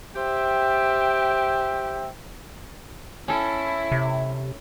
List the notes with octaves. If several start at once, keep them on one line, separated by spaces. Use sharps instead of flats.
G4 C5 E5 G5
C#4 E4 A4
C3